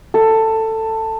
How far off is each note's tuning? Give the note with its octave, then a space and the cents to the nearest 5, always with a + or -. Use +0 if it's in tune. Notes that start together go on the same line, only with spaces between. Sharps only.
A4 +15